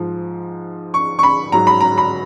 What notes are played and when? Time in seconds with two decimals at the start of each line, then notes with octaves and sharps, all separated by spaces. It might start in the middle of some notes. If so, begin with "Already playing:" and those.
Already playing: G#2 F3
0.94 C#6
1.19 C#6
1.23 B5
1.52 G#2 F#3 A#5
1.67 B5
1.81 A#5
1.98 B5